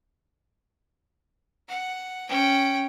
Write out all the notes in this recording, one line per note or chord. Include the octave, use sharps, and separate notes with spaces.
F#5
C#4 G5